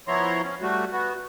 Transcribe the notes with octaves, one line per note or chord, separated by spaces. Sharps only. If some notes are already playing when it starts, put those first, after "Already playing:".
F3 B3 E4 C#5 A#5 C6
C#4
G3 A3 F#4
B3 F#4